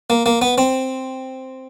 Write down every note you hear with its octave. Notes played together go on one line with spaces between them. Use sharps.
A#3
A#3
B3
C4